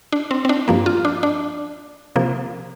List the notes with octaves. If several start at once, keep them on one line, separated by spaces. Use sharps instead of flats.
D4
C4
C4
D4
G2 F3 A#3
F4
D4
D4
C3 F3 A#3